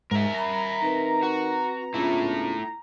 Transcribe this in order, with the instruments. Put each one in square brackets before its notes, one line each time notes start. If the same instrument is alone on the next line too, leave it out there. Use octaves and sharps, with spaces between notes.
[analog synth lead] G#2 [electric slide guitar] A#4 E5
[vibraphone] G3 B5 [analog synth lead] A#5
[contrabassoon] D#3 [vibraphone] C4 B4
[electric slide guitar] F#4
[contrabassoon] C#2 [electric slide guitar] A3 E4 [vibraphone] B3 D4 F4